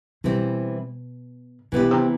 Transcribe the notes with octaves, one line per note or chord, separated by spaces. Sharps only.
B2 E3 G3 C4 E4
B2 E3 B3 E4 G4
C3